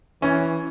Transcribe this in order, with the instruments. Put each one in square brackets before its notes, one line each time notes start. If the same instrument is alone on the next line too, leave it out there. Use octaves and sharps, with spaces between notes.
[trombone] E3 [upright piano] C#4